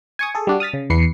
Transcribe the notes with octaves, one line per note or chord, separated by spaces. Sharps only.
G#5 C#6 D#6
G#4 A4
G3 D4 F#4
D#6 F6 A6 B6
C#3
E2 B4 C7 C#7